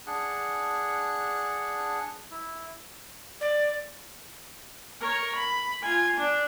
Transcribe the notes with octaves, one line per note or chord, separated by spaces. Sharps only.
D4 G#4 F#5
E4
D5
A#4 C#5
B5
F4 G#5
D4